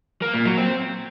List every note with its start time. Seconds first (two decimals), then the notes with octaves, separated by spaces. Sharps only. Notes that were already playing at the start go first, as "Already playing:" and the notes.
0.22 A#3
0.34 A#2
0.46 F#3
0.57 C4